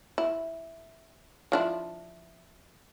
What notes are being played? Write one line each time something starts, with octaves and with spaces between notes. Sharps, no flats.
E4
F3 D4 E4